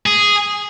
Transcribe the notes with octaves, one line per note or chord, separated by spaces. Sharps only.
G#4